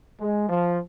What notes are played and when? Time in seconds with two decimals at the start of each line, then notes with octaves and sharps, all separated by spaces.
0.20 G#3
0.49 F3